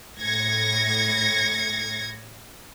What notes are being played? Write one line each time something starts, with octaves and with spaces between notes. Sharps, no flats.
A2 G#6 A#6 C#7